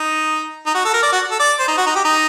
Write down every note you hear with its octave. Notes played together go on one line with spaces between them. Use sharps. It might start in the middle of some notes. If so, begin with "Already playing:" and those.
Already playing: D#4
D#4
F#4
A4
A#4
D5
F#4
A4
D5
C5
D#4
F#4
D#4
G4
D#4